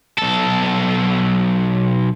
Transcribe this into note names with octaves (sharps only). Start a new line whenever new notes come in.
B1 A4